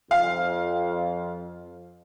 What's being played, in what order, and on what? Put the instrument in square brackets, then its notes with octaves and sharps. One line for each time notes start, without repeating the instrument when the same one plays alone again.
[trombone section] F2 [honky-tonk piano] F5